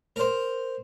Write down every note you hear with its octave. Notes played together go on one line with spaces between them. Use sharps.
A#4 C5